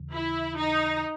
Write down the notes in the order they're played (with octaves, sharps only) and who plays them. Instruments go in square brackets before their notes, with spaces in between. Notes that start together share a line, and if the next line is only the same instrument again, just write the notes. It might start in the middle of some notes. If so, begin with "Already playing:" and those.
Already playing: [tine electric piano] D#2 C#3 E3
[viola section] E4
D#4